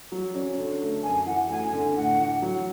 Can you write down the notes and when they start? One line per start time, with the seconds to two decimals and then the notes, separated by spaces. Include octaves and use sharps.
0.12 F#3
0.35 C#4
0.58 D3
0.81 A3
1.03 F#2 G#5
1.26 E3 F#5
1.49 D2 G#5
1.73 D3
1.96 A2 F#5
2.18 E3
2.42 F#3